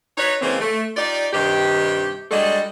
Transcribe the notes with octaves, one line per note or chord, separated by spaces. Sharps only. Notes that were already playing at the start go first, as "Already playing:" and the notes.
D#4 F#4 B4 C#5
C#3 E3 G#3 A#3 C4
A3
D#4 F4 G4 D5
G2 C3 D#3 G4
G3 G#3 D4 F#4 A4 D#5